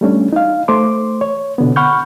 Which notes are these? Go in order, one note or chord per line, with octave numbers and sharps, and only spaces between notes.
G3 A3 C#4 D4
D#4 F5
A3 C5 C6 D6
C#5
B2 D3 B3
F#5 B5 C#6 F6 G6